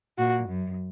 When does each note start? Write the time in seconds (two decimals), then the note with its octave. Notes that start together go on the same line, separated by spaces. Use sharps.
0.18 A#2 F#4
0.49 F#2